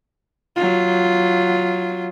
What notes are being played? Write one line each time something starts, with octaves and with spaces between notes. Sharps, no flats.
F#3 F4